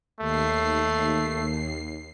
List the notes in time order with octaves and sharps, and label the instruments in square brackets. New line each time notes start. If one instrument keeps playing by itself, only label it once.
[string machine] D#2 C7 [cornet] A3